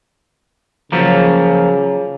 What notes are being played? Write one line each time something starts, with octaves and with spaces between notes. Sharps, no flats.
C#3 F3 F#3 A#3